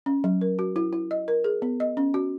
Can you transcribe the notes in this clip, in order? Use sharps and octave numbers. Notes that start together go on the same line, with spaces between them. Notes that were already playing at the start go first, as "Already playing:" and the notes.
C#4
F#3
A#4
F#4
E4
E4
D#5
A#4
G#4
B3
D#5
C#4
F#4